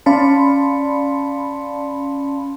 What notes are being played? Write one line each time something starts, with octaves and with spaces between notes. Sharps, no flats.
C#4 D5 F5 A5 B5 C6